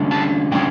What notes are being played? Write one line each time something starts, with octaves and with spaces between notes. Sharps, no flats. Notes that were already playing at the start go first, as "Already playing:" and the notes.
Already playing: D3 G3 C#4
A5
D3 G3 C#4 G5